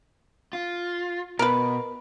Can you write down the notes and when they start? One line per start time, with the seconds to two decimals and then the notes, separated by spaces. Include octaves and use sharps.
0.53 F4
1.39 B2 A#4 B4